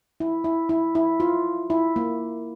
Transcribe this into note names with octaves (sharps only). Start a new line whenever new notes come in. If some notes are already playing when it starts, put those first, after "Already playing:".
E4
E4
E4
E4
F4
E4
A#3